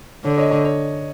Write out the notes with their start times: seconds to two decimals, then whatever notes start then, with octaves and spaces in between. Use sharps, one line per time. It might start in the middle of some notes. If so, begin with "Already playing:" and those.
0.24 D3 C#5
0.38 C#5 D#5
0.51 C#5 D#5
0.65 C#5